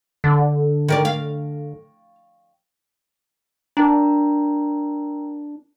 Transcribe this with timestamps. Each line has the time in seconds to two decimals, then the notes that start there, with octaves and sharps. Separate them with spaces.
0.24 D3
0.88 D#3 A#4 D5
1.05 F5
3.77 D4 A#4 G5 A#5